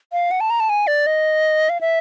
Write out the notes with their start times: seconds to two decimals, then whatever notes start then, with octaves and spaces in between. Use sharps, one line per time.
0.12 F5
0.31 F#5
0.40 A5
0.50 A#5
0.60 A5
0.70 G#5
0.87 D5
1.07 D#5
1.69 F5
1.81 E5